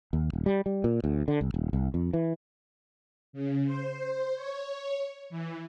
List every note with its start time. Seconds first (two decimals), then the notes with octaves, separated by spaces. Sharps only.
0.13 D#2
0.33 D#1
0.46 G3
0.66 G3
0.84 A#2
1.04 D2
1.28 D3
1.41 C2
1.54 D#1
1.73 C2
1.94 F2
2.13 E3
3.33 C#3
3.66 C5
4.36 C#5
5.30 E3